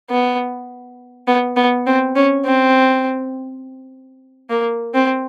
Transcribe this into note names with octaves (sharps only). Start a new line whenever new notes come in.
B3
B3
B3
C4
C#4
C4
A#3
C4